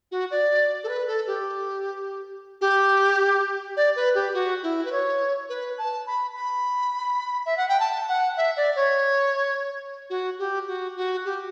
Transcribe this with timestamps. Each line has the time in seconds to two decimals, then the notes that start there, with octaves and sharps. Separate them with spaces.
0.12 F#4
0.31 D5
0.84 A4
0.89 B4
1.07 A4
1.27 G4
2.61 G4
3.77 D5
3.96 B4
4.15 G4
4.34 F#4
4.63 E4
4.85 B4
4.92 C#5
5.49 B4
5.78 A5
6.07 B5
6.36 B5
7.46 E5
7.57 F#5
7.68 G5
7.80 A5
8.09 F#5
8.37 E5
8.57 D5
8.76 C#5
10.10 F#4
10.39 G4
10.67 F#4
10.96 F#4
11.25 G4